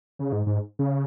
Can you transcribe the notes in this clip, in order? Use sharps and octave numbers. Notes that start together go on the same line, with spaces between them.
C#3
G#2
G#2
C#3